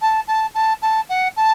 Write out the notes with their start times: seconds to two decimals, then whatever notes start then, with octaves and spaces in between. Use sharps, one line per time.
0.01 A5
0.27 A5
0.54 A5
0.82 A5
1.09 F#5
1.36 A5